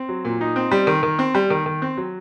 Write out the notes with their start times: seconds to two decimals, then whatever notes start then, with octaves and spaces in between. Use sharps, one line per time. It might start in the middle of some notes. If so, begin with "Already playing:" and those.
Already playing: C4
0.09 F#3
0.25 A#2
0.41 D#4
0.56 C4
0.71 G3
0.87 D#3
1.03 D#3
1.19 C4
1.35 G3
1.50 D#3
1.66 D#3
1.82 C4
1.97 F#3